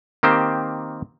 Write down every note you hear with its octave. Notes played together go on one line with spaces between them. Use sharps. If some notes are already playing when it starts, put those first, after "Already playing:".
D#3 A#3 C4 G4 C5